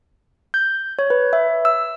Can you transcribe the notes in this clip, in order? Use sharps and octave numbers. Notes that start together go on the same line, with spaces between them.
G6
C#5
B4
E5
E6